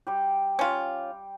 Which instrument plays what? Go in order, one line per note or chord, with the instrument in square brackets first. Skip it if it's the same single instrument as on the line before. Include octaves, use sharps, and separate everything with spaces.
[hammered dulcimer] G3 G4
[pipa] C#4 F4